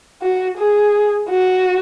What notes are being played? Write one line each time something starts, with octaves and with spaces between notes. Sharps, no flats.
F#4
G#4
F#4